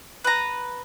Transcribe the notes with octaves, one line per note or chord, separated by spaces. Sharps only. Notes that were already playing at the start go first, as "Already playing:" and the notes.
B4 A#5